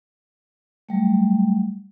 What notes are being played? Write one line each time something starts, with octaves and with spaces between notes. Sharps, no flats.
F#3 G3 A3